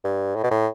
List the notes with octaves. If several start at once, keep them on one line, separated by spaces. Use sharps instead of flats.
G2
A2
B2
A2